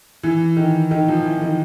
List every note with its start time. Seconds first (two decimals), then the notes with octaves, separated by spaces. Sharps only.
0.23 E3
0.57 D#3
0.91 D#3
1.08 F3
1.25 E3
1.41 D#3